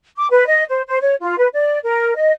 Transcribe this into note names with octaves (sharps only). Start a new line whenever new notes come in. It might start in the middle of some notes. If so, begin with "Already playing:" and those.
D6
B4
D#5
C5
C5
C#5
F4
B4
D5
A#4
D#5